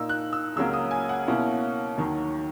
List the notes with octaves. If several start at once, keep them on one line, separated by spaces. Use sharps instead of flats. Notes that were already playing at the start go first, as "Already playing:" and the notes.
Already playing: A#2 A#3 D#4 E6
F#6
E6
C#2 C#3 F#3 A#3 C#4 E6
D#6
G#5
F#5
B2 A#3 C#4 E4
D#2 D#3 F#3